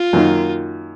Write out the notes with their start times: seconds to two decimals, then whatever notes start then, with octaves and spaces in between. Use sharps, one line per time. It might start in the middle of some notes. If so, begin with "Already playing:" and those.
Already playing: F4
0.13 F#2 D#3 A#3 D#4